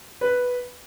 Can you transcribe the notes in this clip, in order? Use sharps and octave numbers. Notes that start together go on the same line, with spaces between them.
B4